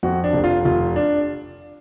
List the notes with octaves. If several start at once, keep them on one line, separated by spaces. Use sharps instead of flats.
F2 F#4
D4
F1
F4
F1 F4
D4